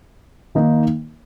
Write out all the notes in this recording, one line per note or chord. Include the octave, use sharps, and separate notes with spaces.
D#3 A#3 D#4